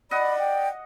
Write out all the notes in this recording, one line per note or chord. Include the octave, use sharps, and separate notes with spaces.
D5 D#5 F#5 B5
G5